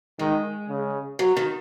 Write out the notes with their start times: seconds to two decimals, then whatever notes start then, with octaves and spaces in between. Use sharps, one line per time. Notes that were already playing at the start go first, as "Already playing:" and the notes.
0.19 D#3 G#3
0.69 C#3
1.19 F#3
1.37 D#3